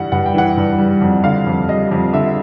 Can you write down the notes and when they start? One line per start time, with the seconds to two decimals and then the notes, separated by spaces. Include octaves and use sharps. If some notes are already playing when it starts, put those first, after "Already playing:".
Already playing: G2 E3 G3 F#5
0.12 G2 F#5
0.26 G5
0.34 E3 F#5
0.57 G2
0.78 G3
1.02 F2
1.24 D3 F5
1.47 F2
1.69 G3 D#5
1.91 F2
2.13 D3 E5